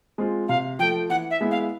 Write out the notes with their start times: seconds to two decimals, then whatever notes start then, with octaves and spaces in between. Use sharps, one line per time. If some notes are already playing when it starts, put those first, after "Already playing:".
0.18 G#3 C4 F4
0.48 C3 F5
0.79 F3 A3 G5
1.10 E3 F#5
1.31 E5
1.41 G#3 B3 E4
1.51 F5